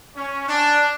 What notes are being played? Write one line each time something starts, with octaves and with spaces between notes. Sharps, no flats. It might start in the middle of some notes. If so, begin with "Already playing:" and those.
C#4
D4